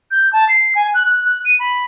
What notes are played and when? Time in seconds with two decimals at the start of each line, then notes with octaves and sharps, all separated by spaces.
0.11 G6
0.33 A5
0.49 C7
0.75 G#5
0.94 F#6
1.06 F#6
1.25 F#6
1.45 D#7
1.59 B5